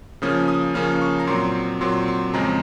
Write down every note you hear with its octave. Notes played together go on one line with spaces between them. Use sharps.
C#3 F3 A#3 C#4 D#6
D#6
C#3 F3 A#3 C#4 F6
C#6
A#5
A#2 F#3 C4 C6
A#2 F#3 C4 C6
C6
F2 C#3 G#3 C4 A#5